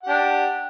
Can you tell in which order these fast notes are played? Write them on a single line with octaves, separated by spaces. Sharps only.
F#5 G4 D4